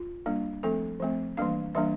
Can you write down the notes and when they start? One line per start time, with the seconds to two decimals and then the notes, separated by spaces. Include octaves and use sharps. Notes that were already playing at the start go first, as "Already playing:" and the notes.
Already playing: F4
0.26 G3 A#3 D4
0.63 F3 A3 C4 A4
1.00 F3 A3 C4
1.37 E3 G3 A#3 D4 F5
1.75 E3 G3 A#3 D4 E5